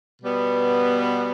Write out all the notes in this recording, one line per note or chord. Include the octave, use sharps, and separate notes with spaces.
B2 G3 B3